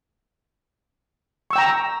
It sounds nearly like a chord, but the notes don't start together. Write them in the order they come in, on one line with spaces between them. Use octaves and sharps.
C#6 E6 G5 A#5